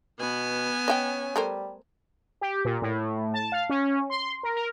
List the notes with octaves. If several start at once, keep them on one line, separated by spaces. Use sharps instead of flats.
B2 B3 G#5
C#4 D#5 E5 G5
G3 A3 A#4 C5
G4
A#2
A2
A5
F5
C#4
C6
A#4
A#4